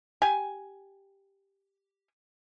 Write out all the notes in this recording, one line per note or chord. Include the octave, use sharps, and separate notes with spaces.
G4 G#5